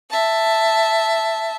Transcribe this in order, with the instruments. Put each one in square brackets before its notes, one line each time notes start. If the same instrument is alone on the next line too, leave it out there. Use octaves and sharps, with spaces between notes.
[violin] E5 A5